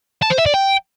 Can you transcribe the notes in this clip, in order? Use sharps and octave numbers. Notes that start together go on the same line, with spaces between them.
A5
C5
E5
D5
G5